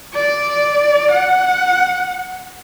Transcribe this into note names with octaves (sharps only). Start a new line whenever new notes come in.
D5
F#5